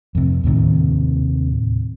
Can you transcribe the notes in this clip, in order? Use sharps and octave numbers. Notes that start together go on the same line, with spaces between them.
F2 C3
D#2 A2 C3 D#3